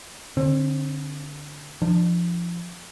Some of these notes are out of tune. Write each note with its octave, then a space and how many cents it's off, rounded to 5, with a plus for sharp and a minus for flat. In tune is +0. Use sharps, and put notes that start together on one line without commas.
D3 +0 C4 +35
F3 -15 D4 +30